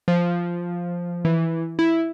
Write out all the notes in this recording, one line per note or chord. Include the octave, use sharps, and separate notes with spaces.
F3
E3
E4